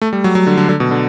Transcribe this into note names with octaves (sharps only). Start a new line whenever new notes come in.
A3
G3
F#3
F#3
D3
D3
D3
B2
D3